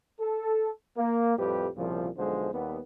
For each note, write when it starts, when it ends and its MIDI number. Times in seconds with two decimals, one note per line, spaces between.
0.20 0.69 69
0.98 1.33 58
1.38 1.67 41
1.38 1.67 45
1.38 1.67 55
1.38 1.67 67
1.38 1.67 71
1.76 2.09 36
1.76 2.09 46
1.76 2.09 49
1.76 2.09 53
2.17 2.51 35
2.17 2.51 50
2.17 2.51 53
2.17 2.51 56
2.17 2.51 72
2.53 2.80 39
2.53 2.80 55
2.53 2.80 59